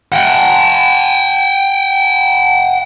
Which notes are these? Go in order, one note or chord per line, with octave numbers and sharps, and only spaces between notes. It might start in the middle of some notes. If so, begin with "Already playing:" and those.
F#5 G5